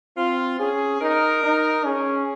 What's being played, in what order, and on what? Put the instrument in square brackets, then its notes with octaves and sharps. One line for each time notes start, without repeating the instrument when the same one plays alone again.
[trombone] C4 [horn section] F4
[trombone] C#4 [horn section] G#4
[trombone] D#4 [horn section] A#4
[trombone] D#4
[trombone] C#4 [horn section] G#4